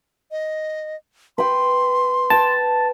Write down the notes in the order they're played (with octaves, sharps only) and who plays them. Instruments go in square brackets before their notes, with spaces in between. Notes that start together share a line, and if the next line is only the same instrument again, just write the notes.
[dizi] D#5
[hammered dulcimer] B4 G5 [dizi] C6
[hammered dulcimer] B4 G5 [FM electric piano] A5